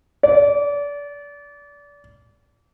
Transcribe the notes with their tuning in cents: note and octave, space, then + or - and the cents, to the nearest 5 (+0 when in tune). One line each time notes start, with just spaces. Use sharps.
D5 -30